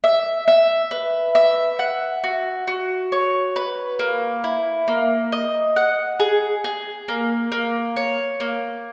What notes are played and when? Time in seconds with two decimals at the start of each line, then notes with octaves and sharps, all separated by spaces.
0.04 E5
0.48 E5
0.91 B4
1.35 E5
1.79 F#5
2.24 F#4
2.67 F#4
3.12 C#5
3.56 B4
3.99 A#3
4.44 E4
4.88 A#3
5.32 D#5
5.76 F#5
6.20 G#4
6.64 G#4
7.08 A#3
7.52 A#3
7.96 C#5
8.40 A#3